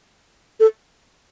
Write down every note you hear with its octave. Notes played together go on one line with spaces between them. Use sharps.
A4